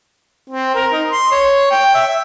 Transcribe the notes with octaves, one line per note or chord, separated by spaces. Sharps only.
C4
A#4
D#4
C6
C#5
G5
E5